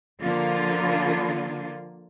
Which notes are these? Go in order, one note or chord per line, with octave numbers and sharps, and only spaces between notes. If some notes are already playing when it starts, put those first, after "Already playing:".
D3 F3 A#3 F4